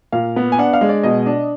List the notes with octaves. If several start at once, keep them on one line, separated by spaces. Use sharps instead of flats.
A#2 F5
B3
G#5
D4 F#5
F5
G#3
D5
B2 D#5
D4